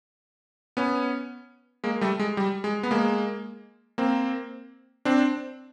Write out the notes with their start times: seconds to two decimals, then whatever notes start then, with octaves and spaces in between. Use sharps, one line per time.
0.77 B3 C#4
1.84 G#3 A#3
2.01 G3 A3
2.19 G#3
2.37 G3
2.64 G#3
2.83 B3
2.91 G#3 A#3
3.98 A#3 C4
5.05 C4 D4